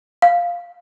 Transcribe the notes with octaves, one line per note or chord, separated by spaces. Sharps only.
F5